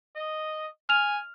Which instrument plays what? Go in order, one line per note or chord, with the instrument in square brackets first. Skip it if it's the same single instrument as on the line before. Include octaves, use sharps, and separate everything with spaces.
[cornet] D#5
[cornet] G#5 [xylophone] F6 F7